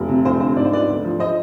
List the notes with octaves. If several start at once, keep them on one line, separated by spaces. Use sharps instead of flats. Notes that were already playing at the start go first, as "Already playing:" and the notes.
Already playing: F1 G3
C3
F1 C5
D3 C5
G#2 D5
C5
B3 B4 D5
D2
F3
C5 D#5